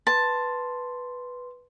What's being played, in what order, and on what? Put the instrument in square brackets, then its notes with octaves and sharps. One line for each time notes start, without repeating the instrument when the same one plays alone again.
[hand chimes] B4 C6 [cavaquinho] A5